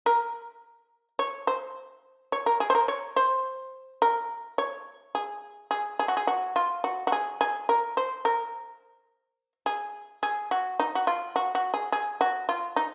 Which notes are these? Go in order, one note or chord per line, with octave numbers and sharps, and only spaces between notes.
A#4
C#5
C5
C#5
A#4
G#4
C5
A#4
C#5
C5
A#4
C#5
G#4
G#4
G#4
F#4
G#4
F#4
F4
F#4
F#4
G#4
G#4
A#4
C5
A#4
G#4
G#4
F#4
D#4
F#4
F4
F#4
F#4
G#4
G#4
F#4
F4
D#4